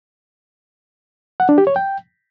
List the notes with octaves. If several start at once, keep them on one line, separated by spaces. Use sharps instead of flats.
F#5
D4
G4
C#5
G5